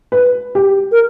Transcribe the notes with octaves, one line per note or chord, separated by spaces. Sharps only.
B4
G4
A#4